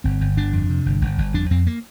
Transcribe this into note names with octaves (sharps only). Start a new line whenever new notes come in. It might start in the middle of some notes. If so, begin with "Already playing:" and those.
G1 C4
G1
G1 D4
F2
C3
G1
G1
G1
F2 D4
F2 C4
A#3